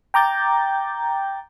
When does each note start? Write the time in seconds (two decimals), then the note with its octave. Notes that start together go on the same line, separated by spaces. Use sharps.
0.14 G5 A#5 D6 G6 A6